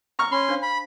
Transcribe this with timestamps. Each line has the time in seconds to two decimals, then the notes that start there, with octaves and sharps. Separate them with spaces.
0.19 A#5 C#6 F6
0.31 C#4 B5 C6
0.49 D4 C5 F5
0.62 B5